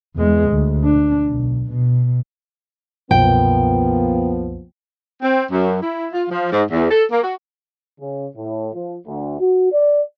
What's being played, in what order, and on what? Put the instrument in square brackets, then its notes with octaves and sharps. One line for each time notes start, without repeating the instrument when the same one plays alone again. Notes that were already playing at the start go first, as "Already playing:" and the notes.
[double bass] E2 G#3
D2
D4
B1
B2
[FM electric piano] C2 F#2 B2 [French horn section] F3 A#3 B3 [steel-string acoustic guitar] G5
[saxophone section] C4
F#2
E4
F4
F3
G#2
E2
A4
A#3
F#4
[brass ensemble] C#3
A2
F3
D2
F#4
D5